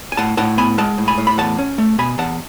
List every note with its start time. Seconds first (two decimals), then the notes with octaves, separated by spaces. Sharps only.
0.12 G#5
0.17 A2 F#5 A5
0.37 A2 F#5 A5
0.57 B3 G#5 B5
0.78 G#3 F#5 A5
0.98 A2
1.08 G#5 B5
1.18 A2
1.27 B5
1.38 E2 F#5 A5
1.59 C#4
1.78 A3
1.98 B2 G#5 B5
2.18 E2 F#5 A5